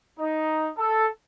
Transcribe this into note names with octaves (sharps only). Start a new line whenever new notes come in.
D#4
A4